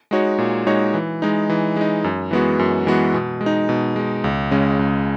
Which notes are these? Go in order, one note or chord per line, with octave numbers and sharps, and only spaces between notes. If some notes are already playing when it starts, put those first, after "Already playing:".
G#3 D#4 F#4 C#5
A#2
G#3 D#4 F#4 C#5
E3
G#3 D#4
E3
G#3 D#4
F#2
E3 G#3 B3 F#4
F#2
E3 G#3 B3 F#4
B2
G#3
D#4
B2
G#3 D#4
C#2
C#3 G#3 C#4
C#2